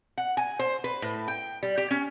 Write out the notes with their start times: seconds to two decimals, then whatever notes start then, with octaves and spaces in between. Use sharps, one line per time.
0.18 F#5
0.37 G#5
0.59 C5
0.84 B4
1.02 A2
1.28 G5
1.63 G3
1.78 G4
1.91 C#4